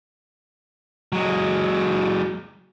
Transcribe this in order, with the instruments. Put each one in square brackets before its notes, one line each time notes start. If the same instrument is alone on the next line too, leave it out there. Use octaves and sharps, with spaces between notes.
[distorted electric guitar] F#3 G#3